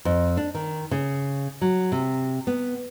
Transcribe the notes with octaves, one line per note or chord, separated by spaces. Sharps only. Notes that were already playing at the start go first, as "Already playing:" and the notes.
F2
D4
D#3
C#3
F#3
C3
B3